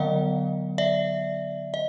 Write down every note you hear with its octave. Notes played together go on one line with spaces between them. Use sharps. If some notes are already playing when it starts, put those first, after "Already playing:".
Already playing: D3 F#3 B3 D#5 F5
D5 E5
D#5